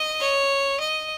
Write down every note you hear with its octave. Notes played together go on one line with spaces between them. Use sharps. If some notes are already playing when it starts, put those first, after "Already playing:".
Already playing: D#5
C#5
D#5